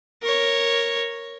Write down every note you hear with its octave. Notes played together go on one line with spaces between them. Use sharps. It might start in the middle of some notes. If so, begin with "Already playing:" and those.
A#4 C#5